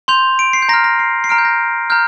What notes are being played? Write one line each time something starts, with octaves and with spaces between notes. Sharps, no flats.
C6 G6 F7
D7
C7
G6
A#5 F6 A#6
A#6
C7
C7
A#5 F6 D7
G6
A#6
A#5 F6 G6